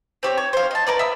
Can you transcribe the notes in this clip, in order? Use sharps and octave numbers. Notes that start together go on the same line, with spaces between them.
C4 G4 C#5
C#5
C5 F5
D#5 A5
A#4 B4 D5
E5 D#6 E6